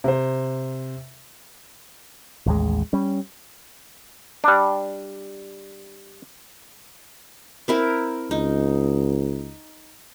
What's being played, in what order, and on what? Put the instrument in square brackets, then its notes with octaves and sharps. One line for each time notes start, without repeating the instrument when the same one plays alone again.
[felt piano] C3 C5
[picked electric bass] A1 D#2 G#3
G3 C#4
[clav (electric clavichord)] G3 D4
[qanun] C4 E4 A#4
[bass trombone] C#2 [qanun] D#4